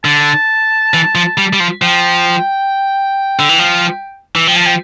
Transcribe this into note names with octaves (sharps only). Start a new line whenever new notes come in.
D3 A5
E3
F3
G3
G3
F3
F3 G5
D3
E3
F3
E3
F3 G5
A5
G5